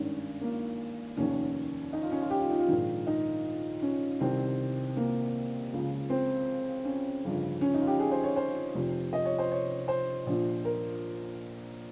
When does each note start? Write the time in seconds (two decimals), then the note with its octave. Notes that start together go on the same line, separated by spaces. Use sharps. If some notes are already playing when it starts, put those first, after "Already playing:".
Already playing: G#1 G2 D#3 C#4
0.41 A#3
1.17 F1 D#2 D#3 C#4
1.93 D#4
2.03 F4
2.11 C#4
2.22 F4
2.30 G4
2.40 F4
2.50 D#4
2.59 F4
2.69 A#1 G#2 D#3
3.07 D#4
3.82 C#4
4.20 C2 C3 D#3 C4
4.97 A#3
5.71 C#2 C#3 F3
6.10 C4
6.85 C#4
7.23 G1 F2 C#3 F3
7.61 C#4
7.74 D#4
7.81 F4
7.87 G4
7.99 G#4
8.11 C5
8.24 C#5
8.36 C5
8.74 F1 F2 C3 F3
9.13 D#5
9.25 C#5
9.38 C5
9.52 C#5
9.88 C5
10.27 A#1 A#2 F3
10.65 A#4